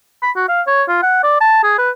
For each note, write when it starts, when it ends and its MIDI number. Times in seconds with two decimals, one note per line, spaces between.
0.23 0.31 83
0.36 0.46 66
0.49 0.62 77
0.68 0.83 73
0.89 1.01 65
1.03 1.22 78
1.24 1.39 74
1.41 1.63 81
1.64 1.77 68
1.79 1.91 71